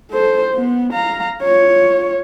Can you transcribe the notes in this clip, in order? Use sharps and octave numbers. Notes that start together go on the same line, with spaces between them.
A4 C5
B3
F5 A#5
F4 C#5